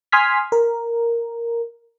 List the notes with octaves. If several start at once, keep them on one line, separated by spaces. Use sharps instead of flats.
G#5 C6 D#6 F6 G#6 B6
A#4